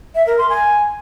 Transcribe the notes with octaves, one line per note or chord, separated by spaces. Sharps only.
E5
A#4
C6
G#5